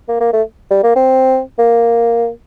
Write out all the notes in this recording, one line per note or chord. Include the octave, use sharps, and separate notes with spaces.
A#3
A#3
A3
G3
A#3
C4
A#3